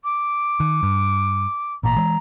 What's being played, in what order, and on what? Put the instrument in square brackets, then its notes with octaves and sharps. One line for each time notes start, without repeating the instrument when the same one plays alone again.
[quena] D6
[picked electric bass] D#3
G2
[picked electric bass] A1 A#2 [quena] A#5
[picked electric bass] E3 G#3